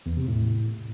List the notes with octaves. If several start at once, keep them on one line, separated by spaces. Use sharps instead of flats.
E2
C3
A2